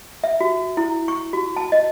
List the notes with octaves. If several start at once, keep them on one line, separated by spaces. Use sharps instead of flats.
E5
F#4
E4
C#6
F#4
A5
D#5